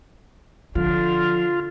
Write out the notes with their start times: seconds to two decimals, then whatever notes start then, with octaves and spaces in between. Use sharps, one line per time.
0.75 D3 F3 F4